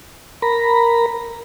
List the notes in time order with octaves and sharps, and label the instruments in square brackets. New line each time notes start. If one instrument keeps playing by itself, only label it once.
[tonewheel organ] A#4 A#5 B5